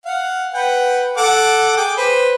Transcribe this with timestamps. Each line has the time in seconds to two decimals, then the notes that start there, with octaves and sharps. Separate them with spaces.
0.05 F5 F#5
0.54 B4 F#5 G5
1.17 A4 F#5 D6
1.77 G#4 G5 D6
1.97 B4 C5